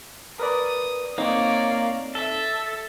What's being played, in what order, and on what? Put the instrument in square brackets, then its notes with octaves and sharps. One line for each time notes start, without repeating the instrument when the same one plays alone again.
[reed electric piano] A#4 B4 D5 [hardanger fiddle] D#6
[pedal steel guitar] A#3 [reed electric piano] C4 D#4 [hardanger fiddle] C#5 D5
[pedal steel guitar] A4 [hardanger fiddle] E5